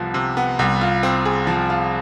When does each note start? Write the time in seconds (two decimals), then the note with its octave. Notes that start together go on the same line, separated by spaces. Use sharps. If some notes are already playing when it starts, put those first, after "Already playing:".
Already playing: C2 C3 F3 B3
0.14 C3
0.37 B3
0.59 C2
0.81 F4
1.03 C4
1.25 G#4
1.47 F3
1.70 F4